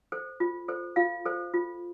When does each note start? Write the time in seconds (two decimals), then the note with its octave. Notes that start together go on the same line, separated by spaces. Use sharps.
0.12 A4 C5
0.40 F4
0.68 A4 C5
0.96 F4 F5
1.26 A4 C5
1.54 F4